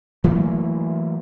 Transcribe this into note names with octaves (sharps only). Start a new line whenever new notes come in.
E3 F#3 A3 A#3